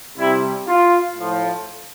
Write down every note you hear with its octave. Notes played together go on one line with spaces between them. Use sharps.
C3 G3 E4
F4
A2 F3